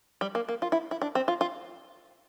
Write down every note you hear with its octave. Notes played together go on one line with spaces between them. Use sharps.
G3
A#3
A#3
F4
E4
E4
D4
C4
F4
F4